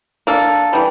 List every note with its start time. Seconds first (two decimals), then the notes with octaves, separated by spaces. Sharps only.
0.27 A#3 D4 A4
0.73 E3 G3